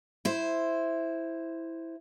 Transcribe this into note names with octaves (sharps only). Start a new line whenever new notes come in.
E4 C5